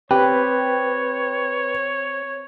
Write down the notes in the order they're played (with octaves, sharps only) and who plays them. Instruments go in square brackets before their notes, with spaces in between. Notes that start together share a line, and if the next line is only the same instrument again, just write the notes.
[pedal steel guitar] C4 [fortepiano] G4 [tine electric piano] B4 [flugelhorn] C#5